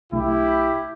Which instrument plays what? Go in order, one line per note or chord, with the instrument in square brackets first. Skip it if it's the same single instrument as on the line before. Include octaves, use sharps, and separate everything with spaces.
[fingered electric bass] B1 B2 A3 D4 [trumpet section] E4 G4